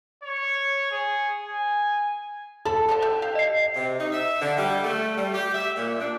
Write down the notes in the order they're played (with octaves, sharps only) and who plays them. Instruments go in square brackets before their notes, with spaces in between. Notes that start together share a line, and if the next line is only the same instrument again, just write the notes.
[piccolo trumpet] C#5
G#4
G#5
[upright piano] A4 [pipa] A5 B5
[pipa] D3 F3 A5
G4 E5
G4 F5
[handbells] D#5 C7
[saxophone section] C3
D#4
E5
D3
G3
A3
G3
G4
E5
A#2
D4